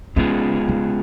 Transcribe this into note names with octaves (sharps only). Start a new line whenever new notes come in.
C#3 G#3 B3 F4 G#4
C#3